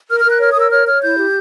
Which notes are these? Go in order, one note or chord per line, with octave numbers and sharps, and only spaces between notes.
A#4 F6
F6
A#4 F#6
C#5 F6
D#6
A#4
E6
C#5 F6
C#5 F6
E4 G6
G4